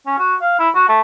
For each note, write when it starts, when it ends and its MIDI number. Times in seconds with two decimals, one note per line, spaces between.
0.07 0.16 61
0.19 0.35 66
0.41 0.57 77
0.59 0.69 64
0.75 0.86 66
0.89 1.01 57